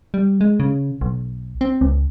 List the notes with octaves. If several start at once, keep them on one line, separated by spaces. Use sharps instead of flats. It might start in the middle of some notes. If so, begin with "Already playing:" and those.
G3
G#3
C#3
B1
C4
C#2